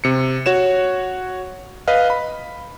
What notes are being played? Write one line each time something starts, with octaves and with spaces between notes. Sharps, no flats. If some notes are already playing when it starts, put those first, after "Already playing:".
C3 C#7
F#4 C#5 E7
B4 D#5 F5
B5